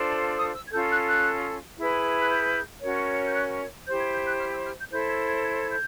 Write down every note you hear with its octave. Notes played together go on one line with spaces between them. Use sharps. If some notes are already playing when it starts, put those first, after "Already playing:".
Already playing: D4 F4 A4 C5
D#6
E6
G#6
C#4 F4 A4 G6
F#6
F#6
E4 G#4 B4
F#6
G6
C#4 F#4 A#4 C#5
G6
F#6
E4 G4 C5 G6
G#6
G6
F#6
F6
E6
F6
G6
E4 A4 C5 G6
G#6
G#6
G#6
G#6
G6